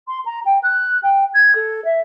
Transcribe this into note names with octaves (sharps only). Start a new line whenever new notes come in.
C6
A#5
G5
F#6
G5
G#6
A4
E5